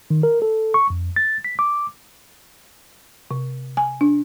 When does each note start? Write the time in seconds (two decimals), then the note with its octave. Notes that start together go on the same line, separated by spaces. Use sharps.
0.10 D#3
0.23 A#4
0.42 A4
0.74 C#6
0.90 F2
1.16 A6
1.45 B6
1.59 D6
3.31 C3
3.77 G#5
4.01 D4